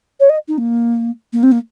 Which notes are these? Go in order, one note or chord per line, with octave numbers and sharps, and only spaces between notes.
C#5
D#5
D#4
A#3
A#3
C4
A#3